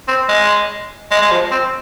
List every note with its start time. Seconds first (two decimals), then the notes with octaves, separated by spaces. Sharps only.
0.08 C4
0.29 G#3
1.11 G#3
1.22 G#3
1.31 F3
1.51 C4